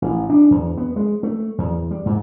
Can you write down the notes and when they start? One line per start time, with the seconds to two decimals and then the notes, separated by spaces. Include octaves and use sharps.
0.02 A1
0.30 D4
0.51 E2
0.77 B3
0.96 G#3
1.23 A3
1.58 E2
1.91 G3
2.06 G#2